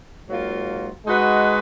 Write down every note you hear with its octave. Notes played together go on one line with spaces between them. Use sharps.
G#2 F#3 A#3 F4
G#3 D#4 F#4 B4